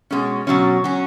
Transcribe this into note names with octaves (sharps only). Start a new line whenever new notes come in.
B2 G#3 C#4
B2 F#3 C#4
F#3 C#4